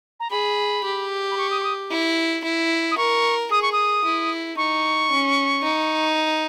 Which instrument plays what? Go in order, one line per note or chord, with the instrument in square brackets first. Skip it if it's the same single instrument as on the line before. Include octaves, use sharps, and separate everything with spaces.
[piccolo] A#5
[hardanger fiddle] G#4 [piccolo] B5
[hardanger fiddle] G4
[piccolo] B5
C#6
D#6
C#6
D#6
[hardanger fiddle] E4
E4
[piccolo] D#6
[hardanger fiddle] A#4 [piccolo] C#6
[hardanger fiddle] G#4 [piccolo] D#6
[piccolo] C#6
D#6
[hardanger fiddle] E4
[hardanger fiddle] D#4 [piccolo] C#6
[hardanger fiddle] C#4
D#4